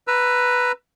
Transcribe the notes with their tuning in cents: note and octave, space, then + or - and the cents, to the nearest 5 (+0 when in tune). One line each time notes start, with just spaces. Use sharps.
B4 +0 A#5 +0 E6 +25